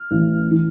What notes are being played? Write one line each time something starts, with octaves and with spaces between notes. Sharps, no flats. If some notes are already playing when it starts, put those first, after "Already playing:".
Already playing: F6
A1
E3